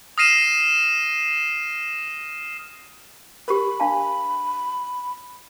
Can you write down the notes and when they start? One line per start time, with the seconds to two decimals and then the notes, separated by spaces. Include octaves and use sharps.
0.18 D#6 F6 A#6 C7 D#7 E7
3.48 G4 A#4 B5
3.80 D4 F5 A5